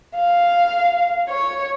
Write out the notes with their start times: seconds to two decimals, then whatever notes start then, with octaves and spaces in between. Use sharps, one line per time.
0.16 F5
1.29 C#5